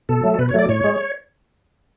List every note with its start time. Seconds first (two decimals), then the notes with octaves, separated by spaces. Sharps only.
0.09 B2 A4
0.23 F#3 A3
0.34 A4
0.39 B2 B4
0.49 C#5
0.54 F#3 A3 D5
0.69 A2 C#5
0.84 G#3